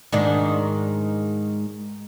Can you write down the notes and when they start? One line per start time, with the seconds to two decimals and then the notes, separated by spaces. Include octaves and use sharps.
0.12 G#2 D#3 D4